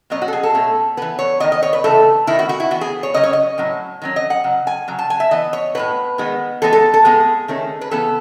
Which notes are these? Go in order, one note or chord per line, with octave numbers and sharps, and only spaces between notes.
B2 F#3 C#4 D#5
F#4
A4
G#4
A4
B2 A3 C#4
E3 B3 B4
C#5
D#3 F#3 B3 D#5
D#5
C#5
B4
C#3 E3 A3 A4
D#3 A3 C#4 E4
F#4
F#4
E4
E3 B3 F#4
G#4
C#5
C#3 F#3 C#4 D#5
C#5
D#5
A2 F#3 C#4
D#3 F#3 C#4
D#5
F#5
C#3 F#3
G#5
C#3 F#3
A5
G#5
E5
E3 B3 D#5
C#5
A2 E3 B3 B4
D#3 G#3 B3
E3 G#3 B3 A4
A4
A4
A2 G#3 B3 G#4
D#3 A3 C#4
B4
C#3 E3 B3 A4